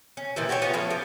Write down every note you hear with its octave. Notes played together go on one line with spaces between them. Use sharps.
C#4
A#2 D#3 E3 G4
F#4 G4 C5 C#5
B3 C#4 F4
F3 A3 B3 C#4
G4